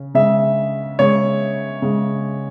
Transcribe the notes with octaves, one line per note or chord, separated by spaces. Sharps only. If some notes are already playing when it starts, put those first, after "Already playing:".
Already playing: C#3
C#3 G#3 E5
C#3 G#3 C#5
C#3 G#3